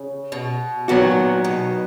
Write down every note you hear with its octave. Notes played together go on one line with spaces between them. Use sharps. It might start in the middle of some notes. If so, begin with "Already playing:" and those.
Already playing: C#3
B2
A#2 D#3 F#3 B3 F#4
B2